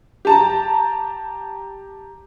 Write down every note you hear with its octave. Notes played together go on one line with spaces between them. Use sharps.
G4 A5 A#5